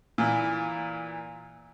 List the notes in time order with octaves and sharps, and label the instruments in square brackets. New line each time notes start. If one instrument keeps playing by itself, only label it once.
[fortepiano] A#2 E3